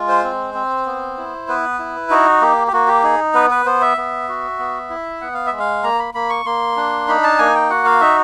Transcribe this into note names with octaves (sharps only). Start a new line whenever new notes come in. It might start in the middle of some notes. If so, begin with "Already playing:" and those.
Already playing: G#3 F4
C5
C4
C4
B3
E4
B3 B4
E4
D#4 F#4
A#3 G4
G4
A#3 F#4
G4
D#4 G#4
B3 B4
B4
B3 C5
E5
B3
F#4
B3
E4
B3 F#5
F5
E5
G#3
F5
A#3 A#5
B5
A#3 B5
C#6
A#3 C6
D4
D#4 B5
A5
A#3 G#5
G5
F#4 F#5
F5
D#4 E5